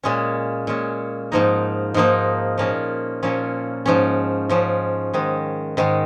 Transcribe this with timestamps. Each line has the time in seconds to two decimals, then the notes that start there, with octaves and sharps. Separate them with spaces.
0.03 A#2 G#3 C#4
0.67 A#2 G#3 C#4
1.32 G#2 F3 A#3 D#4
1.94 G#2 F3 A#3 D#4
2.58 A#2 F3 A#3 C#4
3.23 A#2 F3 A#3 C#4
3.86 G#2 F3 C#4
4.49 G#2 F3 C#4
5.14 G#2 D#3 G#3
5.77 G#2 D#3 G#3